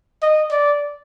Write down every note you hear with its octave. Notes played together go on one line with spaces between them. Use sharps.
D#5
D5